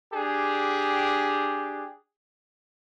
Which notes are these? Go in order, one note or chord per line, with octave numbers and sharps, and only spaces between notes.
D4 G4 G#4